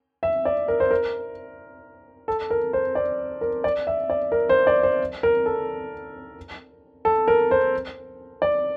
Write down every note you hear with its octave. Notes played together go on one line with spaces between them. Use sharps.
E5
D5
A#4
C5
A#4
A4
A#4
C5
D5
A#4
D5
E5
D5
A#4
C5
D5
C5
A#4
A4
A4
A#4
C5
D5